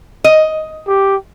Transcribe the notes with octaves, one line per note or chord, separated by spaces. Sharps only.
D#5
G4